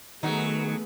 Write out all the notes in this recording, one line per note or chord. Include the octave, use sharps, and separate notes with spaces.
D#3 F#3 A3 B3 D#4 G#4